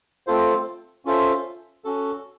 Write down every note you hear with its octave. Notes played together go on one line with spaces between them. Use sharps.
A3 C4 F4 A4 C5
C#4 F4 A4 C5 E5
C#4 F#4 A4